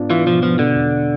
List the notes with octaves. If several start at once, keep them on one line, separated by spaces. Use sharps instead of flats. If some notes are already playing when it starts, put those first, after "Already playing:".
Already playing: G#2 B3 D4 F4
E3 F4
B2 F3
F3 B3
B2 D3
E2